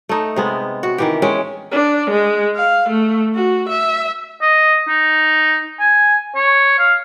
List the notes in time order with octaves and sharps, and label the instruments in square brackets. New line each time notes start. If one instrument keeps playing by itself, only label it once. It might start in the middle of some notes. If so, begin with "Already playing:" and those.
[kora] A3 D#4
C3 G#3 B3
F#4
D#3 E3 G4
G#3 C#4 G5
[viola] D4
G#3
F5
A3
F#4
E5
[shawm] D#5
D#4
G#5
C#5
F5